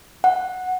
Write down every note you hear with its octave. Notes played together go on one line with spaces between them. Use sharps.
F#5